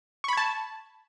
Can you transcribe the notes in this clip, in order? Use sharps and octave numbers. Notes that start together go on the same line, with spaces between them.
A5 B5 C#6 G#6